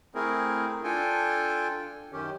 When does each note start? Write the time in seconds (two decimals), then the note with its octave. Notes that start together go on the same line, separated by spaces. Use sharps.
0.15 A3 C4 E4 G#4 A#4
0.84 D4 F4 A4 G5 G#5
2.13 F#2 D#3 C#4 G4